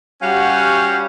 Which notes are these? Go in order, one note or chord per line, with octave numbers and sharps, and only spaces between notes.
G3 C#4 F#4 G4 F5 F#5